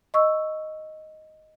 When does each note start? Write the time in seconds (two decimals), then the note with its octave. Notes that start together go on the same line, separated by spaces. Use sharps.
0.14 D#5 C#6 E6